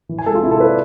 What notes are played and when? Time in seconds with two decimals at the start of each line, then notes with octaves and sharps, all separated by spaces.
0.09 E3
0.19 G#5
0.26 G#3 A4
0.35 F4
0.43 C3 E4
0.51 A4
0.60 B4
0.68 D5